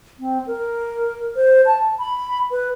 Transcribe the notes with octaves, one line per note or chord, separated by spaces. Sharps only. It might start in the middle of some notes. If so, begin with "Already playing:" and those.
C4
A#4
C5
A5
B5
B4